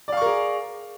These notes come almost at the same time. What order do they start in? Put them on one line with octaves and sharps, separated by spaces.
D5 F5 C#6 A#4 G#4